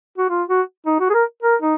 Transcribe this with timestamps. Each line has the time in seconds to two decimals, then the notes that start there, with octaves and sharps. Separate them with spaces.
0.18 F#4
0.29 F4
0.48 F#4
0.86 D#4
1.00 F#4
1.10 G#4
1.14 A#4
1.42 A#4
1.62 D#4